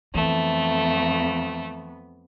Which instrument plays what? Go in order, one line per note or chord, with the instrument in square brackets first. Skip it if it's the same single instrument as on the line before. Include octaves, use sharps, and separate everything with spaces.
[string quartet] F2 B3 [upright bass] E3 [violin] A3